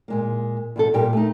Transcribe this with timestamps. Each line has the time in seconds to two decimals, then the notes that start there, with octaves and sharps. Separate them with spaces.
0.08 A#2 G#3 A#3
0.76 E2 B2 A4
0.94 A#2 G3 B3 G4 A#4 G5
1.13 A3 D#4